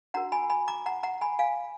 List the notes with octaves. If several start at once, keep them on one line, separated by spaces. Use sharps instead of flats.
D4 F#4 A#4 F#5 A#5
G#5 B5
G#5 B5
A#5 D6
F#5 A#5
F#5 A#5
G#5 B5
F5 G#5